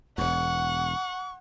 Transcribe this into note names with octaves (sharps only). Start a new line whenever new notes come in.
E1 E2 F#5 C#6